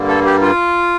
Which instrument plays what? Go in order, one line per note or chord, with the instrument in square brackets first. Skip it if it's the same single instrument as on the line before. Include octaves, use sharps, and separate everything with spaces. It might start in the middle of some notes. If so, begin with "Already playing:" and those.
Already playing: [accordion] G2 D3 G3 A#3
A4
G4
F4